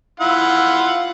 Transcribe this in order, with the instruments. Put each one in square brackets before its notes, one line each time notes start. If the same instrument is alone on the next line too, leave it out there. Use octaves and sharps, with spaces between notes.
[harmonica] E4 F4 F#5